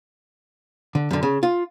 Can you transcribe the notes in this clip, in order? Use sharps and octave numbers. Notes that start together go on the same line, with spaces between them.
D3
F#2 D3
C#3
F4